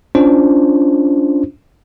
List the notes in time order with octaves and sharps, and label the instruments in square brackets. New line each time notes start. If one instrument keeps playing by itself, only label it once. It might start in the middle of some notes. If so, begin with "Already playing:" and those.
[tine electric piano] C#4 D4 F4 C5